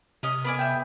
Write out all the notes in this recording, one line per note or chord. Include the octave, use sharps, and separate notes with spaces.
C3 C#4 D#5
A#3 B3 D5 G#5
E5 G5